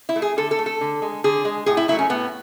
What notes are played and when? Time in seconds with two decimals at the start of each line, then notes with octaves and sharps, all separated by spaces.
0.09 E4
0.16 A3
0.22 G#4
0.36 D3 A4
0.51 A4
0.59 A3
0.66 A4
0.81 D3
1.02 G#3
1.24 D3 G#4
1.45 G#3
1.66 A2 G#4
1.77 E4
1.88 F#3 E4
1.92 A3
1.99 C#4
2.10 A2 B3